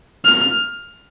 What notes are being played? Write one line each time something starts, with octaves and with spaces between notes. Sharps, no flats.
F6